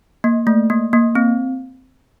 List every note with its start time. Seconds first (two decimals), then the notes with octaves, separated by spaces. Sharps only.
0.24 A#3
0.47 A3
0.70 A#3
0.93 A#3
1.15 C4